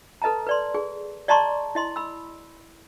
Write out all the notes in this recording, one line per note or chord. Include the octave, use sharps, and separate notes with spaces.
A4 B4 D#5 A5 A#5
B4 D5 C6
G#4
D5 D#5 A5 A#5 C6 C#6
E4 D#5 C6
B5 E6